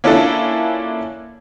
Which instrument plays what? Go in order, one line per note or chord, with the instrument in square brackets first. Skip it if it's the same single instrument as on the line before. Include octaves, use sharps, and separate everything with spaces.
[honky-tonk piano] A#3 C#4 D4 E4 F4 A4